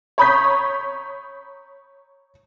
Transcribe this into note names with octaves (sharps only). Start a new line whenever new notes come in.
C#5 A#5 B5 D#6 G6 B6